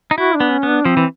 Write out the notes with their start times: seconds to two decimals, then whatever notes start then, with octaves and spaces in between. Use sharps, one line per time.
0.11 D#4
0.18 E4 F#4
0.35 D4
0.40 B3
0.51 C#4
0.63 B3
0.68 D4
0.85 F3 C4
0.97 E3